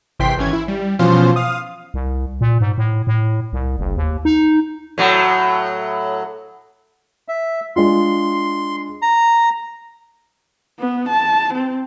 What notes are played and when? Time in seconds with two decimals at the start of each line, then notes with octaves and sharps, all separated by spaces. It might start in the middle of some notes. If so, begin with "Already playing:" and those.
0.19 G#1 C3 E3 G5 C6 B6
0.37 G#1 E3 C#4 G#6
0.53 E4
0.68 G3
0.99 B2 E3 F3 C#4 F4 C5
1.36 F5 D#6
1.94 C2
2.41 A#2
2.61 G#2
2.78 A2
3.07 A2
3.53 C2
3.79 F#1
3.97 D#2
4.25 D#4
4.98 A2 F#3
7.28 E5
7.76 G#3 D4 F4 C6
9.02 A#5
10.80 B3
11.09 A5
11.54 C4